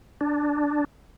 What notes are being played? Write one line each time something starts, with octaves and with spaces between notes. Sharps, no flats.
D4